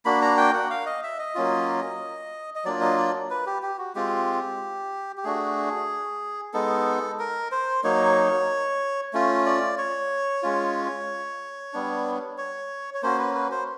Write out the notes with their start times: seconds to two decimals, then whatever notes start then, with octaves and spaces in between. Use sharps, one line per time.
0.05 A#3 D4 F#4 B5
0.22 A#5
0.37 G5
0.54 F#5
0.70 F5
0.86 D#5
1.03 E5
1.19 D#5
1.35 F#3 A#3 C#4 F4
2.55 D#5
2.65 F#3 A#3 D4 F4 D5
2.81 D#5
2.97 D5
3.30 B4
3.46 G4
3.62 G4
3.78 F#4
3.95 G#3 C4 F4 G4
5.17 G4
5.24 A3 D4 F#4 G#4
6.53 G#3 B3 D#4 A4
7.19 A#4
7.52 C5
7.83 F#3 A#3 D#4 C#5
9.13 A3 C#4 F4
9.46 D5
9.78 C#5
10.43 G#3 C#4 F4
11.73 G3 B3 D4
12.38 C#5
12.94 C#5
13.03 A#3 C#4 F#4 C5
13.18 B4
13.35 B4
13.51 C5